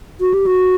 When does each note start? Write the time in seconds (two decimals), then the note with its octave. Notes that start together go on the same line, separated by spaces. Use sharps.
0.21 F#4
0.34 G4
0.46 F#4